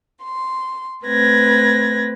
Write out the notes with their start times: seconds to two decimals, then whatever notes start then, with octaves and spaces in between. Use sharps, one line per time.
0.22 C6
1.04 A3 C4 B4 G#6 A#6